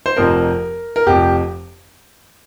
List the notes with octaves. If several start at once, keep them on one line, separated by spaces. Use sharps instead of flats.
C5
F1 F2 F3 A#4
A#4
F1 F2 F3 G4